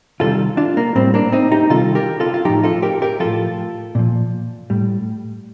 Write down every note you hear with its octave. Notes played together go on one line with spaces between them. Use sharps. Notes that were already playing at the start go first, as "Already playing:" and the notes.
C3 D#3 G3 F4 A4
D4 F4
A#3
A2 G3 C4
A#3 D4
C4 D#4
D#4 G4
C3 D#3 G3 F4 A4
G4 A#4
F4 A4
F4
A2 F3 D#4 G4
F4 A4
G4 A#4
G4 A#4
A2 F3 F4 A4
A#2 F3
A2 G3